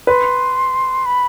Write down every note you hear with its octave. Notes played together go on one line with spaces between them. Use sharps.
B4 C6
B5